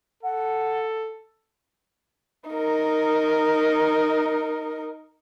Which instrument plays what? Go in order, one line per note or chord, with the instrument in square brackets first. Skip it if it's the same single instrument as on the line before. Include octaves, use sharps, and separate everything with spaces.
[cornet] A4 [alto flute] F#5
[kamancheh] D#4 A#4